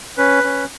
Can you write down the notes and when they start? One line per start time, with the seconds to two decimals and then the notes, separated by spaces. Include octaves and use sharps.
0.18 C#4 B4
0.44 C#4